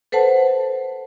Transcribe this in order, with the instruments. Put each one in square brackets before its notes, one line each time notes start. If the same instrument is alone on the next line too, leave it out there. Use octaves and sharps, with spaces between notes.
[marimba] A4 B4 C5 F#5 A5